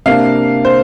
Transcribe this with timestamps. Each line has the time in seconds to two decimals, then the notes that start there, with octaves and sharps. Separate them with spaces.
0.06 C3 A#3 D4 F5
0.65 C5